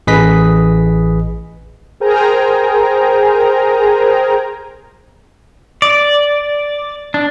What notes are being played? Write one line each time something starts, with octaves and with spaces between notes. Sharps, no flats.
A1 G#4 B4 D#5 B6
G#4 A#4 C5 G5 G#5 A#5
D5
D4